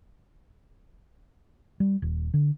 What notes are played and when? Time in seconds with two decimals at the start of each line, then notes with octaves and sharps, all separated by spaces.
1.80 G3
2.02 D#1
2.34 D3